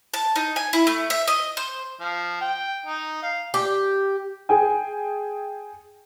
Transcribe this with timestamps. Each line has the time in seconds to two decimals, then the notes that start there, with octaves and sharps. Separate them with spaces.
0.14 A5
0.36 D#4
0.56 G#5
0.73 E4
0.87 A3
1.10 E5
1.27 D#5
1.57 C5
2.00 F3
2.41 G5
2.85 D#4
3.22 F5
3.54 G4
4.49 G#4 G5 G#5